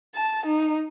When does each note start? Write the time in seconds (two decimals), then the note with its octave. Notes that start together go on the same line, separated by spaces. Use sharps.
0.15 A5
0.46 D#4